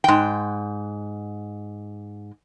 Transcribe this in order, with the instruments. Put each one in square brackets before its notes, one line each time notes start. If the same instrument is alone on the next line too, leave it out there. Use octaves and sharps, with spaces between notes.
[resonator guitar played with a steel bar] G#2 G5